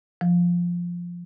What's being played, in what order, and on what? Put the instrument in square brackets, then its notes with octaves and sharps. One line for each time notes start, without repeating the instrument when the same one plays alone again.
[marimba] F3